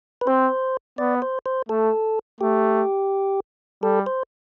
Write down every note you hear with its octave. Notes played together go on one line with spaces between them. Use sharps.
B4
C4 C5
B3 D5
C5
C5
A3 A4
A3 G4
G3 A4
C5